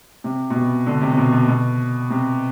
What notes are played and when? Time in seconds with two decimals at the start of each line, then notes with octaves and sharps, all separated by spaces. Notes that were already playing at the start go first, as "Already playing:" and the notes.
0.24 C3
0.50 B2
0.55 C3
0.86 D3
1.01 C3
1.12 C3
1.18 B2
1.32 B2
1.48 B2
2.10 C3